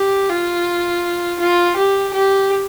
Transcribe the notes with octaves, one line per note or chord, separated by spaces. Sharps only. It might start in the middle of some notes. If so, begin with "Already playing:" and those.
Already playing: G4
F4
F4
G4
G4